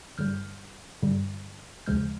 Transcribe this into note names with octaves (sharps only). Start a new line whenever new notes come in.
G2 D3 G3 F6 G6
G2 D3 G3
D#2 C#3 F3 G#3 F6 G6